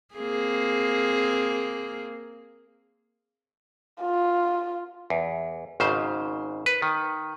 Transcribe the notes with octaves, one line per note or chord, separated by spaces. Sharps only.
A#3 C4 G#4
F4
E2
G#1 G#2 C#3 C5
B4
D#3